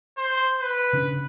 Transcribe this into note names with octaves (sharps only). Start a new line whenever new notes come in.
C5
B4
C#3 C#4 D4